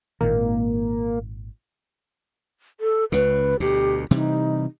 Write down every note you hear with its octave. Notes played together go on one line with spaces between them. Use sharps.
G#1 A#2 D#3 A#3
A4
C#2 C#3 B4
D2 B2 G4
C3 E3 G3 D#4